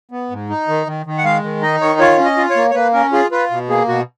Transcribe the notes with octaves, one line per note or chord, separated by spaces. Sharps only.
B3
G#2
D#4
D#3
D#3
D#3
F#5
G#3 F5
D#3
D#4 D#5
D#3 C#5
F4 C#5
C#4
D#5
F4
C#5
A#3
C#5
A#3 B4
C#4 A#4
F4 G#4
F4 B4
B2
A#3 G#4
B2 F#4